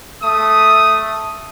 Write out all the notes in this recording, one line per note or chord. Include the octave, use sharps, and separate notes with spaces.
A3 D#6